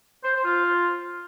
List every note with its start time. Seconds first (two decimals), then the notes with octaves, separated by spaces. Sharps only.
0.24 C5
0.35 C5
0.45 F4